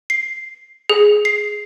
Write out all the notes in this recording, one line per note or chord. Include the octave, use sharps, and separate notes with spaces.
C7
G#4
C7